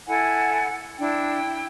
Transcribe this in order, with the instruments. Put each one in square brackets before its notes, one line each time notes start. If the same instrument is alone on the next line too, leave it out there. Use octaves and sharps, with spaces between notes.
[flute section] E4 A4 G#5 [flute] F#5
[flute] D4 [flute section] E4 G5